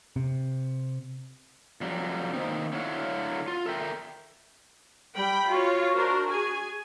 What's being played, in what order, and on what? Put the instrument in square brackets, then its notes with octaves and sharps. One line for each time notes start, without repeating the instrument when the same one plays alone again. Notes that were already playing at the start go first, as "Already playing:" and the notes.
[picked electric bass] C3
[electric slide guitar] F2 F#3 G3
D#3 A#3 C4 D#4
D3 F#3 E4 C#5 F5 F#5
F4
A4 A#4 E5 G5
[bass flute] G3 [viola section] G5 B5
[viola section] F4 C#5 [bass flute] F#4
[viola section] D4 A#4 C5
G#4 G#5